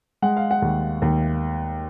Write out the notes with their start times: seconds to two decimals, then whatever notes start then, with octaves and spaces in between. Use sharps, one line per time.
0.22 G#3 F#5
0.37 F5
0.51 F#5
0.62 D#2
1.02 D#2